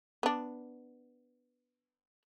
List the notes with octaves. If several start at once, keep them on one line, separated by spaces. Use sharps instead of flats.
B3 D4